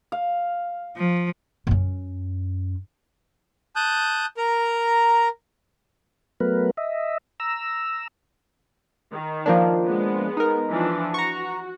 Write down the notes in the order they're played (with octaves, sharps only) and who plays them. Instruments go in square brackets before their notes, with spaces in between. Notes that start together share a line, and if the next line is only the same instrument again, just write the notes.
[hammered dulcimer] F5
[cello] F3
[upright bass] F#2 C#4
[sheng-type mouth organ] A5 D#6 F#6 G6
A#4 A#5
[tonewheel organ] F#3 A3 B3 A#4 B4
D#5 E5
A#5 E6
[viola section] D#3
[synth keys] F3 A#3 D4
[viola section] G#3 B3
[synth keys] D#4 A#4
[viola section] E3 F3 D4
[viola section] F#4 [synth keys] A#5 C#6